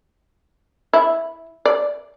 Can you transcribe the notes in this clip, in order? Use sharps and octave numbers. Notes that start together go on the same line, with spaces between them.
E4
D5